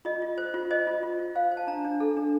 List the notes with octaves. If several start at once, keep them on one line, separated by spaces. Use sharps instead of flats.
F4 D#5
F4
C5
F4
C5 D#5
F4
F4
F4
C5 F5
C5
A5
D4 A#5
D4
A4
D4